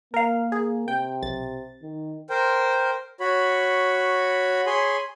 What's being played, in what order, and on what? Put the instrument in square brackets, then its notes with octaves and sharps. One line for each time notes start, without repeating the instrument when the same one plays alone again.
[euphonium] A#3 [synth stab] A#4 F5
[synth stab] G#4
[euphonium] C3 [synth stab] G5
[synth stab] B1 A6
[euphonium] D#3
[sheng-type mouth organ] A#4 C5 G5
F#4 C#5 B5
G#4 C#5 G#5 B5 C6